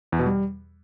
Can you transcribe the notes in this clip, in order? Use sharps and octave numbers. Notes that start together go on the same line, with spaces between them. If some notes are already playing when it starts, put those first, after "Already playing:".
E2
B2
G3